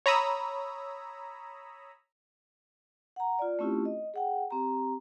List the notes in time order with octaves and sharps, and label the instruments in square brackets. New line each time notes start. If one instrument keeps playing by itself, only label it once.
[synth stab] C#5 A#5 B5 D#6 E6
[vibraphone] F#5 A#5
F4 D5
A3 C4 C#4 E4 F4 G4
D#5
G#4 F#5 G5
C4 G4 A#5